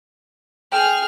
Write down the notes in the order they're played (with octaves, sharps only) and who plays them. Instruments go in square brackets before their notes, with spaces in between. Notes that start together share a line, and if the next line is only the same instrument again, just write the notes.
[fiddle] G#4 F6 [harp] G5